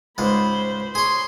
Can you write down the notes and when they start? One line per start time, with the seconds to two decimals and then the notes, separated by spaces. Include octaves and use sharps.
0.18 C#2 G#2 G#3 C5 B5
0.95 G#4 C#5 C6